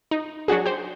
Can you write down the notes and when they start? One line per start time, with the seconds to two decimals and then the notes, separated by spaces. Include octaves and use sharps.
0.11 D#4
0.48 F#3 D4 F#4 G#4
0.66 G4 C5